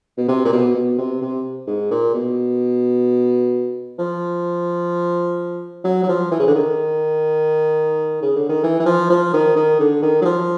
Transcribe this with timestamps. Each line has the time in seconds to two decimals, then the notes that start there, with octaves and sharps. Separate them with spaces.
0.18 B2
0.28 C3
0.45 A#2
0.52 B2
0.75 B2
0.98 C3
1.22 C3
1.67 G#2
1.91 A#2
2.15 B2
3.99 F3
5.85 F#3
6.03 F#3
6.09 F3
6.31 E3
6.39 C#3
6.48 D3
6.55 D#3
8.22 C#3
8.36 D3
8.49 D#3
8.64 E3
8.80 E3
8.86 F3
9.10 F3
9.34 D#3
9.56 D#3
9.80 D3
10.03 D#3
10.22 F#3
10.25 F3